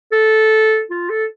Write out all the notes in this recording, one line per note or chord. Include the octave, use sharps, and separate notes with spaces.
A4
F4
A4